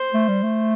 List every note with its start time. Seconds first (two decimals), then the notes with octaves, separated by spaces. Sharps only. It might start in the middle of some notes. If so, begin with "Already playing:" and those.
Already playing: C5
0.14 A3
0.29 G3
0.43 A3